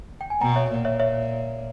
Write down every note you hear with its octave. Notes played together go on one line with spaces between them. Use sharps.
G5
G#5
B2 G5 A#5
C#5 E5
A#2
C#5 E5
C#5 E5